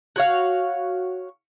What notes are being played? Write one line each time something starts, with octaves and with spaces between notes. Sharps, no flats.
F#4 C#5 F5